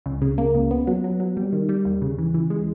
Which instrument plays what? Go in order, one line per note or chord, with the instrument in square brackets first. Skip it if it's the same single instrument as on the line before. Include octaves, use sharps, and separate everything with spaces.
[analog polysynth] C#2
C#3
A#3
C#2
B3
F#3
F#3
F#3
G3
D#3
G3
D#2
C#3
E3
E3
G#3